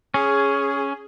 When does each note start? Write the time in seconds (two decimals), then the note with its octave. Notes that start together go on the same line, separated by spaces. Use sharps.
0.14 C#4 G#4